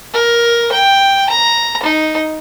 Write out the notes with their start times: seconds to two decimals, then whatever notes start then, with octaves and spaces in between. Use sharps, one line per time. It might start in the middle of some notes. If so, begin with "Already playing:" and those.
0.14 A#4
0.72 G5
1.30 A#5
1.83 D#4